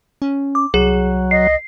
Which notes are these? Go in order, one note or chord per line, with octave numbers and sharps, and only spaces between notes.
C#4
D6
C2 F#3 G#4
D#5 C7